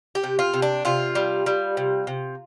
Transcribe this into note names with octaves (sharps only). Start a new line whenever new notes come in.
G4
C3
F4
C3
D4
C3 F4
G3
G3
C3
C3